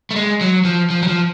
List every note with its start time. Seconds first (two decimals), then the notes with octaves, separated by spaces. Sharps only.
0.11 A3
0.16 G#3
0.41 F#3
0.65 F3
0.90 F3
1.03 F#3
1.08 F3